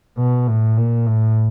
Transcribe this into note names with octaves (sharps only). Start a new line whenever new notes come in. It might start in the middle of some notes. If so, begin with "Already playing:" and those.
B2
A2
A#2
A2